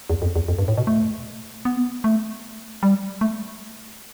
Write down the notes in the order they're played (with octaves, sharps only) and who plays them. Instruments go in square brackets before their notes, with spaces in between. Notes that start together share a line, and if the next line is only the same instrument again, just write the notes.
[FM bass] E2
F2
E2
F2
G2
A2
B2
A3
B3
A3
G3
A3